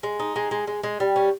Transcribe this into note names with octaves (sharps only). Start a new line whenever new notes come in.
G#3
D#4
G#3
G#3
G#3
G#3
G3
C#4